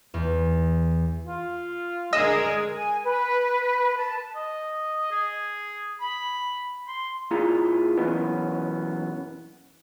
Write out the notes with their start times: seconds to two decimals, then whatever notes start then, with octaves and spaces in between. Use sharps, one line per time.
0.14 E2
1.27 F4
2.13 D3 G#3 G#4 A#4 D#5 E6
2.75 G#5
3.03 B4
3.97 A5
4.36 D#5
5.11 G#4
6.01 B5
6.88 C6
7.31 A#2 E4 F4 G#4 A#5
7.97 F#2 B2 E3 B3 C#4